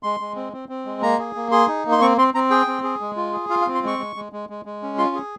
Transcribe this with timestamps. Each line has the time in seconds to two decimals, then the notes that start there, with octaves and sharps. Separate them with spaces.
0.03 G#3 C6
0.20 G#3
0.36 C4
0.53 C4
0.69 C4
0.85 G#3
1.02 A#3 A#5
1.19 G#4
1.35 A#3
1.51 G#4 C6
1.68 D#4
1.85 A#3
1.92 C6
2.01 C4 C#6
2.17 C4 C6
2.34 C4 A#5
2.50 G#4 G5
2.67 C4
2.83 G#4
3.00 G#3
3.16 F4
3.33 G#4
3.49 F4 F5
3.62 F5
3.67 C4
3.75 C6
3.83 G#3 C#6
3.99 G#3
4.16 G#3
4.32 G#3
4.49 G#3
4.65 G#3
4.82 C#4
4.98 F4 C6
5.15 G#4